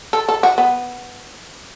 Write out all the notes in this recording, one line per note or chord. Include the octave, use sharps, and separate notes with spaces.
A4
A4
F#4
B3